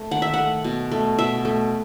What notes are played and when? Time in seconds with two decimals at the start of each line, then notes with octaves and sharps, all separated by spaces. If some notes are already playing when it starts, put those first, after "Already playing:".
Already playing: A3
0.11 D#3 F#5
0.22 E5
0.34 A3 F#5
0.64 B2
0.92 A3
1.19 B2 E5
1.45 A3